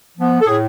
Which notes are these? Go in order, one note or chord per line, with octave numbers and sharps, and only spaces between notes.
F3 B3
A4
A2 G#4